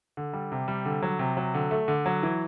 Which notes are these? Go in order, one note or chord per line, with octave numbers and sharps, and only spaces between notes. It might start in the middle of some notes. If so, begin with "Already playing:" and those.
D3
G3
C3
G3
D3
F#3
C3
F#3
D3
A3
D3
F#3
E3